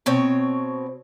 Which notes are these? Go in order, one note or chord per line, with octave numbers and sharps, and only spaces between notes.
B2 C4 C#5